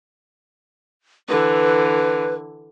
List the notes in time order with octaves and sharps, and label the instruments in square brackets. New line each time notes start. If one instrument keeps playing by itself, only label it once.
[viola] D3 E3 [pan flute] B4